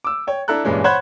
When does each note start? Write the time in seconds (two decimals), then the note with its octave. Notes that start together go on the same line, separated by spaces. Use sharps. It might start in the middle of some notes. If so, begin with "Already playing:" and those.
0.04 D6 E6
0.27 C#5 G5
0.48 D4 E4 A4 A#5 F#6
0.64 G2 A#2 E3 G#3 C#4 D4
0.84 C5 C#5 F#5 B5 F#6 G#6